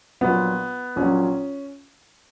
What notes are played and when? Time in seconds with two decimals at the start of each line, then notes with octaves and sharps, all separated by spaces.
0.21 A#1 A#2 F#3 B3
0.96 A#1 A#2 F#3 C#4